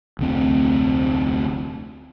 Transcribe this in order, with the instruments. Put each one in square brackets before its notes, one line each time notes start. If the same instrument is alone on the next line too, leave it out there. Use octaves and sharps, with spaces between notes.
[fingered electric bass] F1 D2 C4